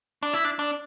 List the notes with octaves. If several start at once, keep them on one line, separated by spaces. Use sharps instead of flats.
D4
E4
D4
D4